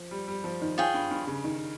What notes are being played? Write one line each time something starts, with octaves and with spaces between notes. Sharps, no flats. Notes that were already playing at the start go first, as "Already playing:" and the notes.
Already playing: F3
G3
G3
F3
D#3
F4 G#4 C#5 G5
G2
G2
C#3
D#3